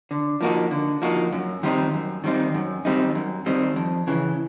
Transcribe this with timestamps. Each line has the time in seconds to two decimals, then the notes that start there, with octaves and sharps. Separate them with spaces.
0.11 D3
0.41 F3 A#3 D#4 F#4
0.71 D3
1.02 F3 A#3 D#4 F#4
1.32 F#2
1.63 D#3 G3 C4 D#4
1.94 F#2
2.24 D#3 G3 C4 D#4
2.54 F#2
2.85 D#3 G3 C4 D#4
3.15 F#2
3.46 D#3 G3 C4 D#4
3.76 F2
4.07 C#3 E3